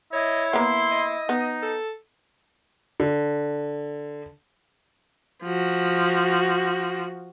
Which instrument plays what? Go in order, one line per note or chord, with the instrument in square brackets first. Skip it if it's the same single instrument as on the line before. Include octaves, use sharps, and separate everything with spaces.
[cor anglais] E4 [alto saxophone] C#5 [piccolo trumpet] D#5
[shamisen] A#3 B3 [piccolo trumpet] C6
[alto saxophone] D#5
[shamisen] B3 [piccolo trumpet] D#4
[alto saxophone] A4
[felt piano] D3
[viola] F3 F#4